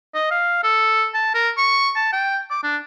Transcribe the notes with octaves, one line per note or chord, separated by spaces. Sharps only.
D#5
F5
A4
A5
A#4
C#6
A5
G5
D6
D4